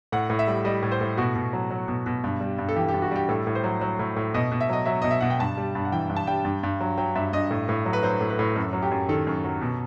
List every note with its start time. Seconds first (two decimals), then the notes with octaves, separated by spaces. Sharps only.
0.12 A2 F#5
0.30 A2
0.39 E5
0.47 G3
0.65 G3 D#5
0.83 A2
0.91 C5
1.01 A2
1.17 B2 F#4
1.35 B2
1.53 F#3
1.71 F#3
1.88 B2
2.06 B2
2.24 G2
2.41 G3
2.58 G2
2.69 A4
2.76 E3 G4
2.89 G4
2.94 G2
3.02 F#4
3.11 G3 G4
3.29 A2 A4
3.47 A2
3.55 C5
3.64 F#3
3.81 F#3
3.99 A2
4.16 A2
4.34 B2 D#5
4.52 B2
4.61 E5
4.69 F#3 D#5
4.85 F#3 E5
5.02 B2 D#5
5.11 E5
5.21 B2 F#5
5.30 G5
5.39 G2 A5
5.57 G3
5.75 G2
5.85 F#5
5.92 E3 G5
6.09 G2
6.16 A5
6.27 G3 G5
6.45 G2
6.63 G2
6.81 F#3
6.98 F#3 G5
7.15 G2 E5
7.33 G2 D#5
7.51 A2
7.69 A2
7.86 F#3
7.93 B4
8.03 F#3 C5
8.21 A2
8.30 B4
8.39 A2
8.56 F#2 A4
8.73 F#3
8.82 G4
8.91 F#2
9.09 D#3 A4
9.27 F#2
9.44 F#3
9.61 B2